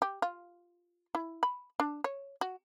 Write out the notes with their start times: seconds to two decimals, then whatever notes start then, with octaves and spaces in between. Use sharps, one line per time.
0.02 G4
0.22 F4
1.15 E4
1.43 B5
1.80 D4
2.04 C#5
2.41 F#4